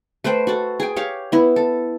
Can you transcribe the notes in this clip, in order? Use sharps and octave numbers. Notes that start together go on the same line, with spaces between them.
A3 B4 C5 G5
F#4 A4
G#4 G5
G4 C#5 F5
B3 E4
A4